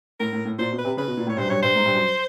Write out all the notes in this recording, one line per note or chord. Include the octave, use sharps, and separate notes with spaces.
A2 A#4
A2
A2
A#2 C5
B2
B4
C3
C#3 B4
B2
A#2
A2
C#5
G2 C5
F#2
G2 C#5
G2 C5
G#2
G2
F#2